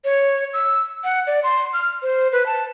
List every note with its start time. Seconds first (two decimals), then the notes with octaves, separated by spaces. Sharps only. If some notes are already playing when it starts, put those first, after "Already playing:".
0.05 C#5
0.53 E6
1.04 F#5
1.27 D5
1.44 C6
1.74 F6
2.03 C5
2.32 B4
2.46 A5